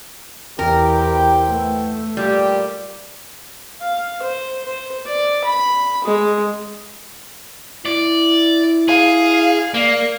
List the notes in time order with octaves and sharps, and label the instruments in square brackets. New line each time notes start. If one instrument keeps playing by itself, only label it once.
[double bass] E2 [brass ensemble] E4 C5 G5 [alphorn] G4 [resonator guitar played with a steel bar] A#4
[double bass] A3 [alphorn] B3
[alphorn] A#2 [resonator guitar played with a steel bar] G3 [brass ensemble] G4
[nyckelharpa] F5
C5
C5
D5
B5
G#3
[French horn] E4 [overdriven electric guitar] D5
[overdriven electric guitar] G#4 [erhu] F5
[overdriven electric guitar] A#3 [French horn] D5